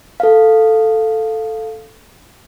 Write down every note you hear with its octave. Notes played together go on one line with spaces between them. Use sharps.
A4 F5